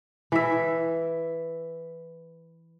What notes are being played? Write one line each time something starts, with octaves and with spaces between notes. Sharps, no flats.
E3 E5